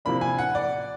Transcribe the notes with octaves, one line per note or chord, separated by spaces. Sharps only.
C3 F3 A#3 D4 B5
G#5
F#5
D5